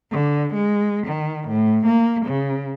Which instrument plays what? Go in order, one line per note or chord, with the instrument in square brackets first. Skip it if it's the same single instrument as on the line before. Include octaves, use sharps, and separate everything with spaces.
[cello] D3
G#3
D#3
A2
A#3
C#3